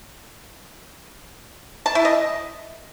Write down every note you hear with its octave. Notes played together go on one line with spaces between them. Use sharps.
A5
E4
D#5